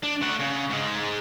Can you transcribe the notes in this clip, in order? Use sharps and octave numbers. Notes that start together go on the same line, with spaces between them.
D4
A3 F#5
C#3
G#2 G#3